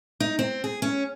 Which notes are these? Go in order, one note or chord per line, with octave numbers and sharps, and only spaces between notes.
D#4
C4
G#4
C#4